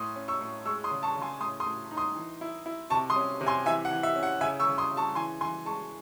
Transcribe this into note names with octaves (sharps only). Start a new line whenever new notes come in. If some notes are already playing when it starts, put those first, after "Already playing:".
Already playing: A2 C6 D#6
C#4
C#6 E6
A2
G#3 C#6 E6
C6 D#6
C#3
A5 C#6
C#3
G#5 C6
A2 C6 D#6
C6 D#6
A2
D#4
C6 D#6
E3
E4
E4
C3 A5 C#6
C6 D#6
C#4
C3
G#5 C6
E3 E5 G#5
F#5
E3
E5
C#4
F#5
C#3 E5 G#5
C#6 E6
C#3
C6 D#6
C#3
A5 C#6
E3 G#5 C6
E3 G#5 C6
G#3 A5 C#6